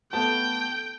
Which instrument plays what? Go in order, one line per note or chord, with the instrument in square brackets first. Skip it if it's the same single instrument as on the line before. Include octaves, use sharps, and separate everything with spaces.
[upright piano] A3 B3 A5 [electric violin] G5